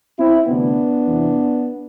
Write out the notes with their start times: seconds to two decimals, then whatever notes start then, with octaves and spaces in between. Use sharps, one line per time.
0.19 C4 E4
0.48 D2 C3 E3 B3 D4
1.07 E2 C3 E3